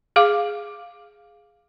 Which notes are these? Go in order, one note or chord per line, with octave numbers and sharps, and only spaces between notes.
G#4 F5 D6